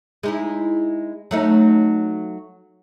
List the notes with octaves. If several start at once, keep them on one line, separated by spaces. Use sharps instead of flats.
G#3 D#4 E4
F#3 A3 D#4